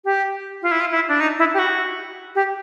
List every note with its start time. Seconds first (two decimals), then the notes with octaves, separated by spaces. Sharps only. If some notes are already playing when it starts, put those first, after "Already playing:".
0.05 G4
0.62 F4
0.71 E4
0.80 F4
0.91 E4
1.08 D4
1.20 D#4
1.39 E4
1.54 G4
1.59 F#4
2.35 G4